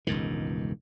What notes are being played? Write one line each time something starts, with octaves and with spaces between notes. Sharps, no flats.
E1 C#2 G2 D#3